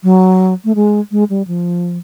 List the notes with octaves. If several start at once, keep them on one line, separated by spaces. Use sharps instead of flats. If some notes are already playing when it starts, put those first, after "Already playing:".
F#3
A3
G#3
G#3
G3
F3